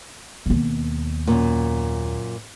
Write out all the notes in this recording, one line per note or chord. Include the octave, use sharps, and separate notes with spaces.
D#2 B2
F#2 A#2